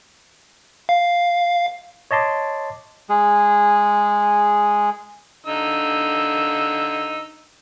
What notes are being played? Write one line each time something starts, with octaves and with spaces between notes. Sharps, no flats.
F5
C#5 D#5 A5 C6 D6
G#3 G#4
D3 D#4 E6